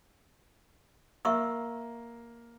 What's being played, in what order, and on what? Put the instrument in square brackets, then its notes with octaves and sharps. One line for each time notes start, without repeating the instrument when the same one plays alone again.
[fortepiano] A#3 [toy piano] E5 C#6 E6